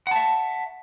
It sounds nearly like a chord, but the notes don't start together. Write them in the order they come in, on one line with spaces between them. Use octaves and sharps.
F#5 A5 E5